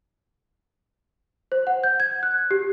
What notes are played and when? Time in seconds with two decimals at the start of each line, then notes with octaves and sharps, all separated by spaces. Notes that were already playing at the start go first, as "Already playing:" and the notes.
1.52 C5
1.67 F#5
1.84 G6
2.00 G#6
2.23 F#6
2.51 G4